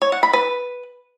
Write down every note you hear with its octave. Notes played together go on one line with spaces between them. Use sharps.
C#5
F#5
B5
B4